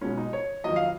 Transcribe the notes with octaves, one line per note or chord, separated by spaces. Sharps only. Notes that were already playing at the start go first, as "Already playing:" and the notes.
B1 B2 G#3 B3 C#4
D#4
C#5
F2 D#3 F#3 D#5
F5